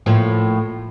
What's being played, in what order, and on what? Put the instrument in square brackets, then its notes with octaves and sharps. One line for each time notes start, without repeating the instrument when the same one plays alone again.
[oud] A2 F3 A#3